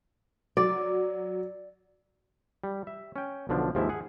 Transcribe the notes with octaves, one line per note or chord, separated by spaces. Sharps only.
F#3 D5
G3
E5
C#4 G5
B1 B2 D3 F3 D4
D#2 G#2 F3 E4 E5
G#4 F#5